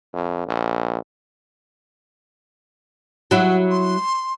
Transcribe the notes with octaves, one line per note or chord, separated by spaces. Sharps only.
F2
A#1
F#3 E4 F#5
C6